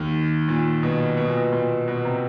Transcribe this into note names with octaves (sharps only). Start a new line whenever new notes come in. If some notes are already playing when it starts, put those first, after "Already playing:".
Already playing: D#2 D#3
A#2
B2
B2
A#2
B2
A#2
B2
C3